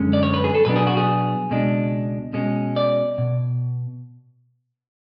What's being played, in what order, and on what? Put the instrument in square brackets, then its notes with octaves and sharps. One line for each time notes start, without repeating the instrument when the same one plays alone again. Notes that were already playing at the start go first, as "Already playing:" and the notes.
Already playing: [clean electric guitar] F#2 D3 G#3 C#4
D5
C#5
B4
G#4
A4
B2 F#3 B3 D4 B4
G#4
F#4
G#4
C#2 B2 G#3 D4
B2 G#3 C#4
D5
B2